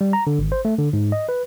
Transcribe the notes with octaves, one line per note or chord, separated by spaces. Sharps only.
G3
A#5
D3
G#1
C5
A3
D3
G#2
D#5
B4